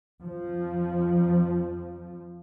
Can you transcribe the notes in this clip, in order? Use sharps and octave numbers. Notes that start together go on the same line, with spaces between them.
F2 F3